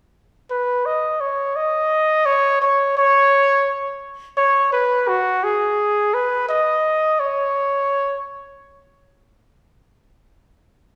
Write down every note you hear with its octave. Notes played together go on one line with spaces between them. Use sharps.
B4
D#5
C#5
D#5
C#5
C#5
C#5
C#5
B4
F#4
G#4
B4
D#5
C#5